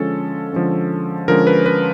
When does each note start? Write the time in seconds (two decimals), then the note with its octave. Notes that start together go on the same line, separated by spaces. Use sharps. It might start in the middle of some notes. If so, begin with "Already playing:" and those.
Already playing: D3 F3 G#3 C#4 A4
0.53 D3 F3 G#3 C#4
1.28 D3 F3 G#3 C#4 A#4
1.47 B4
1.66 B4